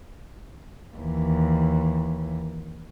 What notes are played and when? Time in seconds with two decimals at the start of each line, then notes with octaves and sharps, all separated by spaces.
0.97 D#2 E3